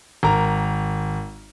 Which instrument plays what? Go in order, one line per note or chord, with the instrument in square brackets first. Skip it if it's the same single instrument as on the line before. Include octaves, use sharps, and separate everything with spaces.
[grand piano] G#1 A#4 A#5